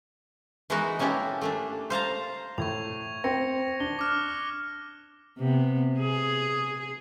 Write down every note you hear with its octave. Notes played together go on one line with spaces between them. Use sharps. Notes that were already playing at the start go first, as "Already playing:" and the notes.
E3 G#3 B3 D#4 F#4 A#4
A#3 C#4 E4 G4 A4
A3 A#3 D4
C5 F5 A5 A#5
A2 C#6 G#6 F7
C4 G5 A#6 C#7
D4 G7
D6 F6 F#6
C3 B3
G#4